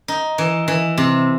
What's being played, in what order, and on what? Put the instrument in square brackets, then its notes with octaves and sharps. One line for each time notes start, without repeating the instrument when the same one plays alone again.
[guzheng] D#4
E3
E3
C3